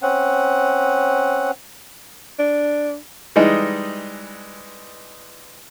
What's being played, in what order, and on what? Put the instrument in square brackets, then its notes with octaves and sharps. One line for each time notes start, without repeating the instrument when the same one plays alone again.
[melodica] C4 C#4 F#5
[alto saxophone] D4
[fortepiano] E3 G3 G#3 D#4